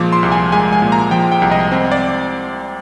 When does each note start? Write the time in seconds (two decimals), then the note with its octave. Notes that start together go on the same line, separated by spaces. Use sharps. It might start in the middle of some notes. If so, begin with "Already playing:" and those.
Already playing: A#2 F3 G#3 D6
0.12 C6
0.23 C2
0.32 G#5
0.52 G#3 G#5
0.73 G#5
0.82 A#2
0.92 A#5
1.11 F3 G5
1.32 G5
1.42 C2
1.51 D#5
1.72 C4
1.92 D5